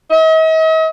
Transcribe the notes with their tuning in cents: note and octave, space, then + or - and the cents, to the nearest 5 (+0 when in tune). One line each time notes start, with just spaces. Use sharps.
D#5 +45